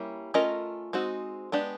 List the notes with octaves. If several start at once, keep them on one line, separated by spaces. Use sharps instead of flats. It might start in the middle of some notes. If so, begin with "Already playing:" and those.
Already playing: G3 A#3 C#4 E4
A3 C#4 F4 A#4 D#5
G#3 C4 D#4 F#4
G#3 B3 D4 G4